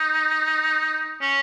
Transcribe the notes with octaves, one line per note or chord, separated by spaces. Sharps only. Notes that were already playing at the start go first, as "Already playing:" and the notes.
Already playing: D#4
C#4